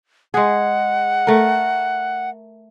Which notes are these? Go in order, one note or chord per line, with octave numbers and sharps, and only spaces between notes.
G#3 G#4 F#5
A3 A#4